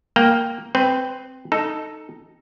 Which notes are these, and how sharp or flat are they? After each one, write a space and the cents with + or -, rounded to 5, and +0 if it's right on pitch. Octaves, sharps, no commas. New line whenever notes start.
A#3 +0 G5 +0
C4 +0 B4 +25
D#4 +0 A4 +5